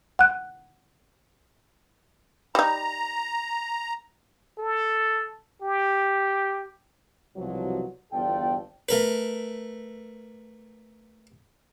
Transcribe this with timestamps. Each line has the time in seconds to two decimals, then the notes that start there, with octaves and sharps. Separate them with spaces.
0.19 F#5 F#6
2.55 G3 D#4 A#5
4.59 A4
5.62 G4
7.36 C2 B2 F3 F#3
8.12 G1 E2 F4 A4 D5 G5
8.89 A3 A#4 B4